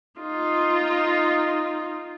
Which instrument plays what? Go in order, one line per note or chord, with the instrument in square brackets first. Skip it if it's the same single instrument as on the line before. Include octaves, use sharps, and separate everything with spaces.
[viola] D#4 F4